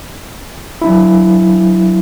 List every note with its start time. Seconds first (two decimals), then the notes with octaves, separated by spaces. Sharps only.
0.82 F#3 D4 E4